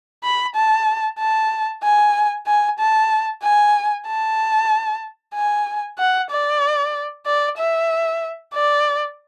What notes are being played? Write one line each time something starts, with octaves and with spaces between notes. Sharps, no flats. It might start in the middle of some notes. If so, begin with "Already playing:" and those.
B5
A5
A5
G#5
G#5
A5
G#5
A5
G#5
F#5
D5
D5
E5
D5